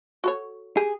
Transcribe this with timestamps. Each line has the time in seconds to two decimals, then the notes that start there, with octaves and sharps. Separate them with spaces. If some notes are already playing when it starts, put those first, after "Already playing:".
0.24 F#4 A4 C#5
0.77 G4 G#4